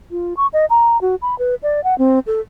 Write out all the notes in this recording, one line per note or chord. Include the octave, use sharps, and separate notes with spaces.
F4
C#6
D#5
A#5
F#4
B5
B4
D5
F#5
C4
A4